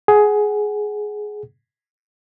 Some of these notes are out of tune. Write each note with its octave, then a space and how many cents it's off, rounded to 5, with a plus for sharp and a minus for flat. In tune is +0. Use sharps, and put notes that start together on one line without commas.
G#4 +15 F#5 +20